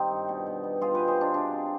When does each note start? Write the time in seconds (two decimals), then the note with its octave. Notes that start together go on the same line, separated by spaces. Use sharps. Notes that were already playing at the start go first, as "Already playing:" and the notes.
Already playing: D#3 G3 C4 D#4
0.11 G2
0.29 B2
0.47 B2
0.64 B3
0.81 G3 F4 G#4
0.95 B2 G4 B4
1.08 G#4 C5
1.17 B2 D4
1.34 C3 D4
1.52 C3